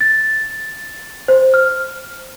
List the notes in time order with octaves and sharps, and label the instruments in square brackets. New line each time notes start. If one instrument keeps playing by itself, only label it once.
[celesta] A6
C5
F6